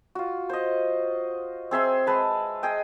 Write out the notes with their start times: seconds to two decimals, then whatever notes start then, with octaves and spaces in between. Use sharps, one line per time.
0.15 F4 F#4
0.49 C5 D#5
1.71 C4 G#4 E5 C6
2.07 G#3 B4 A5
2.63 G#4 D#5 G5